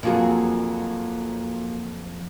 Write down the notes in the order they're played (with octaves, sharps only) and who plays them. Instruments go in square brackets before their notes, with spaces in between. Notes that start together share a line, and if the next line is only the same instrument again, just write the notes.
[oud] F2 F#3 G#4 [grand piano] A#2 A#3 F#4